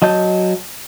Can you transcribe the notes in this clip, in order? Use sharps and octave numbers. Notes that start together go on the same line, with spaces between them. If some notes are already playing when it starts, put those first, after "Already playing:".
F#3 D#5 A5 G6